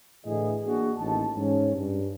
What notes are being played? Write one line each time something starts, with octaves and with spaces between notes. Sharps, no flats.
A2 D3 E3 G#4 D#5
A#3 D4 F#4 G#4
A1 D#2 D#4 A5
G#2 C#4
G2